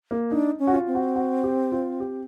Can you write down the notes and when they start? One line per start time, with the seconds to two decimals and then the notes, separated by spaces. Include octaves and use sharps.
0.11 A#3
0.31 D4 D#4
0.59 C#4
0.67 F#4
0.73 F4
0.87 C4
0.95 F#4
1.16 F#4
1.44 G4
1.72 F4
2.00 G4